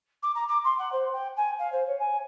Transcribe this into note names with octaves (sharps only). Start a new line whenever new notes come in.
D6
A#5
D6
C6
F#5
C5
G5
G#5
F5
C5
C#5
G#5